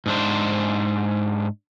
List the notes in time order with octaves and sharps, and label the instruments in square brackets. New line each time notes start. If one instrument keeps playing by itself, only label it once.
[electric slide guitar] G#2 D4 C5